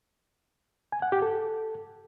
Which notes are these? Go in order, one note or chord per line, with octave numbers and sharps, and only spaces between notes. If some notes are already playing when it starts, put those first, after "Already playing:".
G#5
F#5
G4
A4